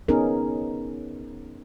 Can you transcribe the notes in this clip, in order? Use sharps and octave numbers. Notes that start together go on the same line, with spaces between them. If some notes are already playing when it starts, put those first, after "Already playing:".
B3 C#4 D#4 G#4 A#4